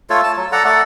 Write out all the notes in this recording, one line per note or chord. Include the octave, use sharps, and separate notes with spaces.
A3 F4 A4 C#5
A5
F#3
A4 D5 F#5 A#5
A3 A4 D5 F#5